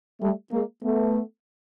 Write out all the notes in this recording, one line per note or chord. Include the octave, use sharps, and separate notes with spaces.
G3 A3
G#3 A#3
A3 B3